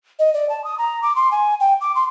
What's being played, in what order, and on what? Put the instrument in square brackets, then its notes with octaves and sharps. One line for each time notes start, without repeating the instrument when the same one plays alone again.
[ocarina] D#5
D5
A5
D#6
A#5
D6
C6
G#5
G5
D6
C6